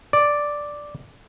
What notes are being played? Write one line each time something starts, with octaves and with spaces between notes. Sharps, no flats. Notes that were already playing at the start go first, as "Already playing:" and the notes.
D5